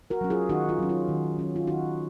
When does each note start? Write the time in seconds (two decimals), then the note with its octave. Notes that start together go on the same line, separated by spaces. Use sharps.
0.10 F#4 A#4
0.21 F#3 C#4
0.30 F4 G#4
0.49 D#3 D#4 F#4
0.69 F4
0.79 F#3 C#4
0.89 F4
1.09 D#3
1.39 F#3 C#4
1.56 F4
1.67 D#3 D#4 F#4